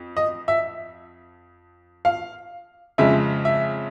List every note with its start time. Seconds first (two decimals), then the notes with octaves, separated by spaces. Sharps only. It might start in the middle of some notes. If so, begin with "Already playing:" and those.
Already playing: F2
0.17 D#5
0.48 E5
2.05 F5
2.98 F2 C#3 F3 G#3 E5
3.45 E5